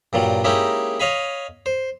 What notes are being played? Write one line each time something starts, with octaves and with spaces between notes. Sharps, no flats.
G2 A#2 F#3 G3
G#3 A#3 C#4 D#4 E4 G4
C#5 D#5 F5 G#5 B5
C5